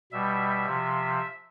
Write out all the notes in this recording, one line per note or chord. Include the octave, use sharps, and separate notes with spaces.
B2 G3 E5
C3 F3